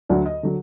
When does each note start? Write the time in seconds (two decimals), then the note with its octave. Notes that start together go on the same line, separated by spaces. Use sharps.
0.09 D2 D3 F#3 D5
0.26 D#5
0.43 D3 F#3